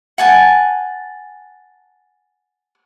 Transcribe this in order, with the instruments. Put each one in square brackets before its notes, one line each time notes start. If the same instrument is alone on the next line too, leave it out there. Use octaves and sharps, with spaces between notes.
[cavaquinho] F#5 G#5 A5